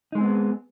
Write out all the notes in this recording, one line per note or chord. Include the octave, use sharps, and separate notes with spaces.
G#3 B3 C4 D#4 G#4